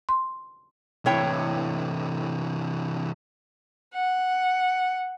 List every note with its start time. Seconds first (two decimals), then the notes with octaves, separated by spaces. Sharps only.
0.09 C6
1.06 A2 C3 E3 C#5 G5
3.93 F#5